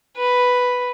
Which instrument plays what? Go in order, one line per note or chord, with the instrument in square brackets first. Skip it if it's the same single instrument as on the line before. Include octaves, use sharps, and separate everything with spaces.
[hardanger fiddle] B4